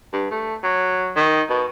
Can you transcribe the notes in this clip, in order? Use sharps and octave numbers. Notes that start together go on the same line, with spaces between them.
G2
A3
F#3
D#3
B2